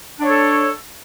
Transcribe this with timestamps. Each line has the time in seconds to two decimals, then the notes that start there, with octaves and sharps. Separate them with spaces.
0.19 D4
0.24 C#5
0.28 A4